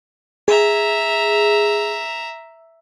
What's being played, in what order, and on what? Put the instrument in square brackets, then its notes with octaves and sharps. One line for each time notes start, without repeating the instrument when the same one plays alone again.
[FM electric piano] G#4 [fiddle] E5 A#5